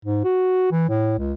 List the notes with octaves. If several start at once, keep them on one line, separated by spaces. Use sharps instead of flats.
G#2
F#4
E3
A2
C#2